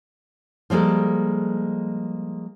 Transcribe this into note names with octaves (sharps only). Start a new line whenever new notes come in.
F3 G3 G#3 A#3 A4